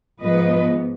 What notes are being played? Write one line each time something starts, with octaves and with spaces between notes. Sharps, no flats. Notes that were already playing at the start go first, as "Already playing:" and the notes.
G#2 F3 B3 B4 D#5